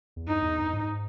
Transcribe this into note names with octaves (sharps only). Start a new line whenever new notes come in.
E2
G2 D#4
E2
G2
G#2